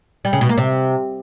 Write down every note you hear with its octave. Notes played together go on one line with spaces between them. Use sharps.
G3
C#3
B2
A#3
C3